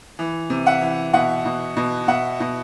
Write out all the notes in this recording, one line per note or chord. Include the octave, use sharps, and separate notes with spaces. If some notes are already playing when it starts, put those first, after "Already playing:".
E3
C3
E5 F#5
E3
B2 E5 F#5
B2
B2
B2 E5 F#5
B2